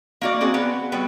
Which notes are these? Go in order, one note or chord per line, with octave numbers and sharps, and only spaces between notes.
A#3 F#4 D5
C4 F#4 G#4
B3
F#3 G3 B3